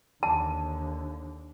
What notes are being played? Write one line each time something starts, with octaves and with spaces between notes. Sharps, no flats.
D#2 D3 A5